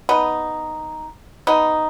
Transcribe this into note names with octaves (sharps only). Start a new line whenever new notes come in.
B3 D#4
B3 D#4